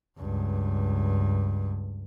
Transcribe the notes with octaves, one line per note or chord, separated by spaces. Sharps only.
C#2 G2